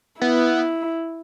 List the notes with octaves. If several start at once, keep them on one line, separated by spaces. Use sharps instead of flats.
B3 E4